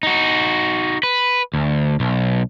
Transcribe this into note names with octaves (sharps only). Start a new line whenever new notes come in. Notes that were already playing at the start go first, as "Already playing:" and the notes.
D#4 F#4
B4
D2
B1